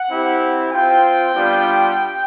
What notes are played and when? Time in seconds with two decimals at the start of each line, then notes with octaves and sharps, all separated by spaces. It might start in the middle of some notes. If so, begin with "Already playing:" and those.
Already playing: F#5
0.10 C4 E4 G4
0.72 C4 F4 G5
1.35 G3 B3 D4 F4